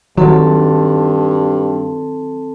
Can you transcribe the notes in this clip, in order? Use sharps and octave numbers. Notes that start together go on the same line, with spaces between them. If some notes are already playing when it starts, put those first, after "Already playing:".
G2 D#3 F#3 C4 A4 A5